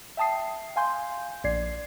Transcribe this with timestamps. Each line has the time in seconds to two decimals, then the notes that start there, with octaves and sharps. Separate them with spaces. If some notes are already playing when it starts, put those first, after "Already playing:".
0.17 E5 G5 A5 D#6 C7
0.76 F5 G#5 C6 G6
1.44 A#1 D5 G#6 C7